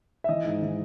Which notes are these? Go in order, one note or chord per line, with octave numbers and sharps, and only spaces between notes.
E5
E3 D#5
G#2
E3